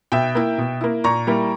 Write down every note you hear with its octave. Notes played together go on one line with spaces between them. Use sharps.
B2 E5 G5
A#3 E4
B2
A#3 E4
A#2 A#5 C#6
G3 A#3 E4